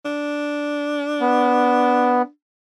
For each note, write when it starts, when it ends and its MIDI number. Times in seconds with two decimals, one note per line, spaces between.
0.05 2.28 62
1.21 2.22 59